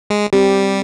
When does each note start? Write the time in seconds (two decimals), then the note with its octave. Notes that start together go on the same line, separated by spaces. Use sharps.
0.10 G#3
0.33 G3 C4 G4